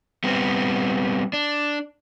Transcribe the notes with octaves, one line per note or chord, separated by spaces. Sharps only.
G3 B3 C4
D4